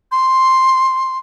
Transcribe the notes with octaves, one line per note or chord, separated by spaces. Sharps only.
C6